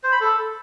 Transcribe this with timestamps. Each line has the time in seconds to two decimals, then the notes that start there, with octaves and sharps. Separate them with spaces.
0.04 C5
0.12 B5
0.21 A4